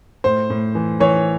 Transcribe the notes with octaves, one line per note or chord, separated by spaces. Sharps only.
A2 C5
A2
E3
E3 C#5